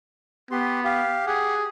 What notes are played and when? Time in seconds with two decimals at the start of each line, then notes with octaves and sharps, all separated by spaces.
0.51 B3 G4 C6
0.84 G4 F5
1.27 G4 G#4 F#5